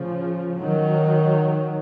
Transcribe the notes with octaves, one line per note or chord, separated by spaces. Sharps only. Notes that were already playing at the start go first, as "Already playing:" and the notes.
Already playing: A2 C#3 F3
D#3 F#3